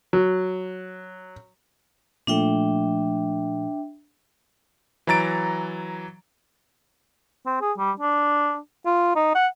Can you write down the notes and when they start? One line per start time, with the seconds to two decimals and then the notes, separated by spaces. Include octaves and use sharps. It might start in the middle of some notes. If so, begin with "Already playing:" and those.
0.13 F#3
2.27 A#2 F3 A3 D4 E5 G5
5.07 E3 F#3 A#5 A6 D7
7.46 C4
7.61 G#4
7.78 G3
8.00 D4
8.86 F4
9.16 D#4
9.35 F#5